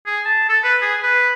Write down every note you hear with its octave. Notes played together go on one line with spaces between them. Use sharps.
G#4
A5
A4
B4
G#4
B4